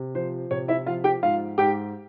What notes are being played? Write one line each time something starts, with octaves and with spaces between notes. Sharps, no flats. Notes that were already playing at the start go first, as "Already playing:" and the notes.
Already playing: C3
F3 C5
C3 C#5
E4 E5
F3 F4 F5
G4 G5
G#2 F4 F5
G#2 G4 G5